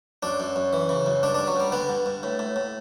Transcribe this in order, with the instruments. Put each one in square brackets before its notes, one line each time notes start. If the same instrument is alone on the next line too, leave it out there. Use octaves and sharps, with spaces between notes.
[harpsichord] F#2 D4
F#2
F#2
E3
C#3
F#2
G2 D4
G2 D4
F#3
G2 G3
D3 B3
G2
G2
A2
A2
A2